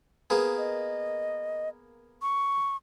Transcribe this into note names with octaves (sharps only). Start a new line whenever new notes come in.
A#3 B3 G#4
D#5
C#6